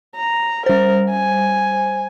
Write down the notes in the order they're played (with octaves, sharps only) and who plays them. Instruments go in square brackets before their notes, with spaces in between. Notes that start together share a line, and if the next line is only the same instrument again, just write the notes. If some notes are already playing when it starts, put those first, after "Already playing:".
[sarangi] A#5
[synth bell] G3 C5 [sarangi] A#4
[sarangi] G#5